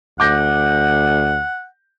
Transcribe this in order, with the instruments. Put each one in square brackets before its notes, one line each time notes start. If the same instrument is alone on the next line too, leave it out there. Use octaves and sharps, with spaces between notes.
[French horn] D2 [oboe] F#5 [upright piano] D6 G6 A#6